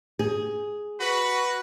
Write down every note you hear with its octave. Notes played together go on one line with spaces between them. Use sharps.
G#4
F#4 B4